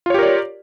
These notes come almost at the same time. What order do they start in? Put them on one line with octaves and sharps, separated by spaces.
F4 C#5 G4 A#4 D5